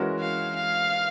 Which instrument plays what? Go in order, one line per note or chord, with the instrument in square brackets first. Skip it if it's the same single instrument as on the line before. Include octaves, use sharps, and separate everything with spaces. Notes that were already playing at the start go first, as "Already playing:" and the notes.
Already playing: [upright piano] E3 G#3 C#4 F#4 A#4
[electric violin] F5
F5